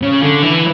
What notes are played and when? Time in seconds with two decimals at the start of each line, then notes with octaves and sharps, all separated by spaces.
0.02 C#3
0.22 D3
0.42 E3